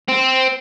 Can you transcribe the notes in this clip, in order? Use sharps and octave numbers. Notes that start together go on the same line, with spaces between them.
C4